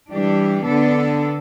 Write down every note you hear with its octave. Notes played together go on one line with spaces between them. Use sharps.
E3 G3 D4 G4
D3 B3 D4 A4